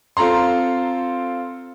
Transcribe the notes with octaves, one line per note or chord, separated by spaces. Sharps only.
C4 F4 A4 A#5 C6